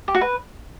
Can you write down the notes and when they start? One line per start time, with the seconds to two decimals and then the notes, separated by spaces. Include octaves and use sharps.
0.08 G4
0.15 F#4
0.21 B4